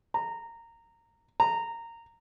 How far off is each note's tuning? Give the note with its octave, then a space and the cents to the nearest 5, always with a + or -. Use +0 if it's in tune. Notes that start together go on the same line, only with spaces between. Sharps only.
A#5 -15
A#5 -15